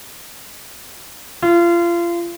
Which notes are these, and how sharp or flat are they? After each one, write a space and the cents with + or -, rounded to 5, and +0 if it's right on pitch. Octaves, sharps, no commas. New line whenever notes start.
F4 -30